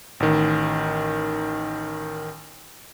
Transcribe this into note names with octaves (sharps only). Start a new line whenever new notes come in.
A1 D#3